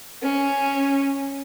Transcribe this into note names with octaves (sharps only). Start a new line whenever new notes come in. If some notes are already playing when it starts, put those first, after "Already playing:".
C#4